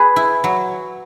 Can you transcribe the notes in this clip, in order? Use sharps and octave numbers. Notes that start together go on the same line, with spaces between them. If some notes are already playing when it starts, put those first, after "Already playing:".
Already playing: G#4 B4
E4
F#3